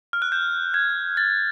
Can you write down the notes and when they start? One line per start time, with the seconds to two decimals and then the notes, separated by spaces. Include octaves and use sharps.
0.13 F6
0.22 F#6
0.32 G6
0.74 G#6
1.17 A6